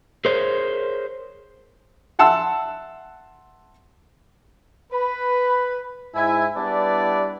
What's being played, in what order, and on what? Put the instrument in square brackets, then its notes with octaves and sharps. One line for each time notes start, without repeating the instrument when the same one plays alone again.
[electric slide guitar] G#4 A#4 C5 C#5
[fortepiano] E5 F#5 A5 C6 E6
[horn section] B4 B5
G#2 E4 G#5
G3 B3 D4 E4 B4 D5